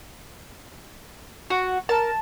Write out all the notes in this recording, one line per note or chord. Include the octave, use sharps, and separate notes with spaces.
F#4
A#4 A5